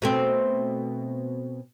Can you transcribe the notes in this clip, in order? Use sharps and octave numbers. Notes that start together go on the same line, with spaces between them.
B2 A3 C4